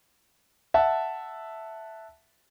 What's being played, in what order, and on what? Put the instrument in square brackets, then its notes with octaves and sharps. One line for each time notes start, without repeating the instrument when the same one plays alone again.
[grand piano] E5 F#5 A5